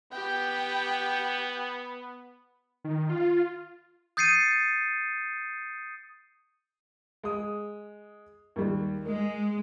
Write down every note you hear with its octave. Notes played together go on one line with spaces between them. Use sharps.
B3 G4 G5
D#3
F4
D#6 G6 A6 C7 C#7 D#7
G#3 D#6
D#2 G3
G#3 A#4